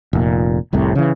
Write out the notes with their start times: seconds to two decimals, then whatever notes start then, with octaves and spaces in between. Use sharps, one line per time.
0.13 F1 A#2
0.73 F1 C2 A2 C3
0.95 C#3 E3